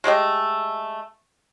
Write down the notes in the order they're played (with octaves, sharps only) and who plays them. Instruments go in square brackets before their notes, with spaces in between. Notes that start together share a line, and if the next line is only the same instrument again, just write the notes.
[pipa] G#3 A3 G4 D#5